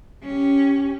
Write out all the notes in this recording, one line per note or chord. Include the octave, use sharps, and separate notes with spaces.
C#4 G4